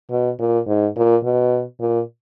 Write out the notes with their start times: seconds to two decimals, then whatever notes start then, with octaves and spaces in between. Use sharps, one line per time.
0.11 B2
0.39 A#2
0.67 G#2
0.96 A#2
1.24 B2
1.80 A#2